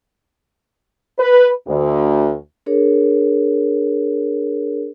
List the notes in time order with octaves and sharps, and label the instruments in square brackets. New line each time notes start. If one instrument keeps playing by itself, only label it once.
[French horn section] B4
D2
[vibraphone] D4 G#4 A#4 C#5